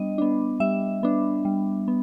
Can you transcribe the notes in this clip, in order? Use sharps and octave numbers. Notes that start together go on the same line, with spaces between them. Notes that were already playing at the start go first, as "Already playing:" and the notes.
Already playing: G3 B3 D4 D#5
B3 D4
G3 E5
B3 D4
G3
B3